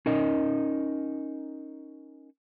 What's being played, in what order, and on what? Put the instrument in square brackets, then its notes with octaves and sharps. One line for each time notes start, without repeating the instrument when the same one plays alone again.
[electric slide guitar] C#4 D#4 A#4 D#5